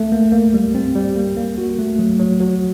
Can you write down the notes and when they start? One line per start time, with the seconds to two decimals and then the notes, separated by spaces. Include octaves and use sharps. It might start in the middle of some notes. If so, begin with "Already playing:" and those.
Already playing: A3
0.12 A#3
0.32 A#3
0.54 G3
0.75 C4
0.95 G3
1.16 A#3
1.37 A#3
1.58 F#4
1.78 A3
1.99 F#3
2.19 F#3
2.40 F#3